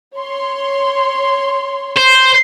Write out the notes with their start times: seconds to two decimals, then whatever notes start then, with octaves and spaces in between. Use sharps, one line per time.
0.18 C#5 C6
1.96 C5